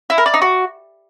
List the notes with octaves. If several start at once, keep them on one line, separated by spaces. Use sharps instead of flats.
E4
A#4
D5
D#4
F#4